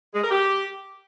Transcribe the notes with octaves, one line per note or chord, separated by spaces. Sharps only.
G#3
A#4
G4